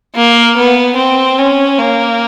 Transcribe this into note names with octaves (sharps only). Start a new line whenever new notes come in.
A#3
B3
C4
C#4
A#3